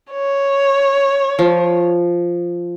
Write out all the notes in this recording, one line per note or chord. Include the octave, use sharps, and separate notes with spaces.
C#5
F3